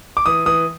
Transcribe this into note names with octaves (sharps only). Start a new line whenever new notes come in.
D6
E3 D#6
E3 D#6